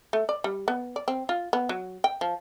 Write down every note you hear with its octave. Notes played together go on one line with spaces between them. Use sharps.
A3
D5
G3
B3
D5
C4
F4
B3
F#3
G5
F3